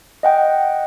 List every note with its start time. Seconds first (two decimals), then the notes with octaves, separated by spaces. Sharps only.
0.23 D#5 F#5 G5